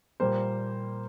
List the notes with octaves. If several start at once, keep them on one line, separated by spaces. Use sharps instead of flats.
A#2 G3 A#3 C5